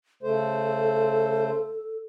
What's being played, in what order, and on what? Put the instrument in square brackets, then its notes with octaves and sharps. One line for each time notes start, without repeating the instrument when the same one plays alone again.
[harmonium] C#3 A3 C5 [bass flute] A4